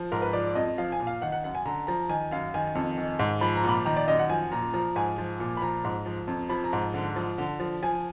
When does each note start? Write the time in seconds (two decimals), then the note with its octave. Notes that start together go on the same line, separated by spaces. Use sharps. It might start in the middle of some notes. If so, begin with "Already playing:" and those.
Already playing: F3
0.12 G#2 A#4
0.22 B4
0.33 F3 D5
0.55 F2 D#5
0.78 F3 F5
0.92 G#5
1.00 A#2
1.07 F5
1.22 D#3 F#5
1.32 F#5
1.44 F#2 F#5
1.55 G#5
1.66 D3 A#5
1.87 F3 A#5
2.09 D#3 G#5
2.31 F#2 F5
2.54 D#3 G#5
2.75 F2
2.98 D#3
3.19 G#2
3.41 F3 B5
3.56 A#5
3.64 A#2
3.69 B5
3.85 D#3 A#5
3.97 D5
4.08 F#2 D#5
4.19 F#5
4.30 F3 G#5
4.51 A#2 A#5
4.74 F3 A#5
4.96 G#2 G#5
5.18 F3
5.40 A#2
5.57 B5
5.62 F3 A#5
5.84 G#2
6.06 F3
6.27 F2
6.50 F3 B5
6.64 A#5
6.73 G#2
6.94 D3
7.16 F3
7.38 D3
7.60 F3
7.82 F3 G#5